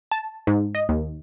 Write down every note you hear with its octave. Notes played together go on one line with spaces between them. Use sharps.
A5
G#2
D#5
D#2